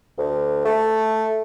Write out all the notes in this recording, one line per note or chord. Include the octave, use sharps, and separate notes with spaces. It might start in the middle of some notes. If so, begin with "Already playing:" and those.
D2
A3